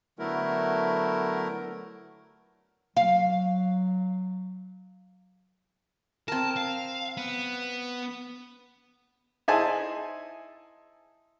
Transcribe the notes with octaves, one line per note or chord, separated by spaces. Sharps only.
D3 F#3 A3 B3 E4 A#4
F#3 F5
C4 A#4 A5
F5
B3
D#4 E4 G#4 C5 G#5 A5